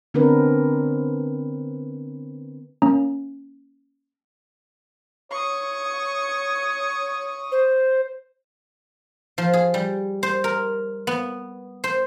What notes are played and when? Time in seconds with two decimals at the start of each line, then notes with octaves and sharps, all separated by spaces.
0.14 D3 B3 C4 D4 A#4 B4
2.82 A#3 C#4 A#5
5.31 C#5 C#6 D#6
7.52 C5
9.38 F3
9.53 G#4
9.74 G3
10.23 C5
10.44 A#4
11.07 B3
11.84 C5